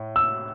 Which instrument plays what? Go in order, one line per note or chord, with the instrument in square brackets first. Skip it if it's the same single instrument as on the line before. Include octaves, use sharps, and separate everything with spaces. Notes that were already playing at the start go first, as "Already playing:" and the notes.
Already playing: [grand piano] A2
E6